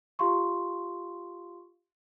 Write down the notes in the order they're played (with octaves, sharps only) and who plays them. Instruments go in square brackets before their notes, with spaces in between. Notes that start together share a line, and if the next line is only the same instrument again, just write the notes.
[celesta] F4 G4 F5 C6 C#6